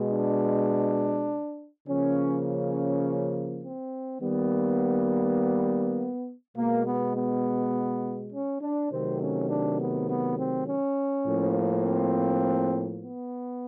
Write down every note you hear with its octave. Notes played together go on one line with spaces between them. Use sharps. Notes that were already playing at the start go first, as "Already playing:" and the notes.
Already playing: B2 G#3
D4
C#3 F3 A#3 C#4
C#4
C4
D#3 G3 A#3 B3
B2 G#3 A#3
B3
B3
C#4
D4
C3 D#3 F#3 A3 C4
C#4
D4
B3
B3
C4
C#4
A2 F3 A#3
C4
B3